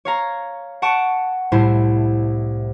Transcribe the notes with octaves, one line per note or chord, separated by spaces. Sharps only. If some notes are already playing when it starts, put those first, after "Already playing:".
C#5 F5 A#5
F#5 A5 C#6 D7 E7
C2 A2 E4 C5